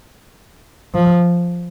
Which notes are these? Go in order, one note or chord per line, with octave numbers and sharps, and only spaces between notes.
F3